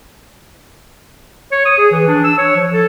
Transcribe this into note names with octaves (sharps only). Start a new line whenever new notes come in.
C#5
D#6
G#4
E3
D4
E6
C#5
F3
A4